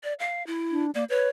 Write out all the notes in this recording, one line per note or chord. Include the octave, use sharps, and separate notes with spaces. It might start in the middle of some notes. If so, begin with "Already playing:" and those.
D5
F5
E4
D4
A#3 D5
B4 C#5